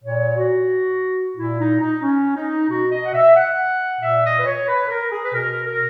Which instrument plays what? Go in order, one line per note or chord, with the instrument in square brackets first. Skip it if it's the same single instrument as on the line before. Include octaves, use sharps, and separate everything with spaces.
[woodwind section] A#2 C#5
F#4
A#2 E4
D#4
D#4
C#4
D#4
B2 F#4
D#5
F#5
E5
F#5
A#2 E5
D#5
B4
C#5
B4
A#4
G#4
B4
B2 A#4
A#4